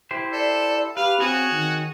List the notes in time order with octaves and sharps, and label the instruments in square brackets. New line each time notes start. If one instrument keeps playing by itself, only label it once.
[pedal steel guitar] E4 G4 C5
[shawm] A4 [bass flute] D5
[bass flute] G4 [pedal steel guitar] B4 [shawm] F5
[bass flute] C4 [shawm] F#4 [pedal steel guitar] G#4 C#5
[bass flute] D#3